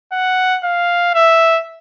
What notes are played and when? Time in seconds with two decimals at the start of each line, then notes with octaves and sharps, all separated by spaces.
0.12 F#5
0.64 F5
1.15 E5